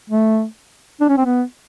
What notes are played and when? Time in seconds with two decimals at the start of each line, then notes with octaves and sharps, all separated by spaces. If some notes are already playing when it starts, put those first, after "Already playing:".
0.10 A3
1.01 D4
1.09 C#4
1.17 C4
1.25 B3